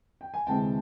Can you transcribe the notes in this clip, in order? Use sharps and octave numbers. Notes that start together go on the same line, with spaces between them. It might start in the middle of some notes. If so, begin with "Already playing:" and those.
G5
G#5
D2 C3 E3 G#3 C4 G5 A5